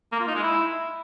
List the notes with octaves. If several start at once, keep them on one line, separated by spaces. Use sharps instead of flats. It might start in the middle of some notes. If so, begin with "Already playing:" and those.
A#3
F4
D#4
G#3
E4